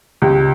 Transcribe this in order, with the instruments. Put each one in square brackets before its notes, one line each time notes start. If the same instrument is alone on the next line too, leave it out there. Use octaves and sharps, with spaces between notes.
[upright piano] C#2 G4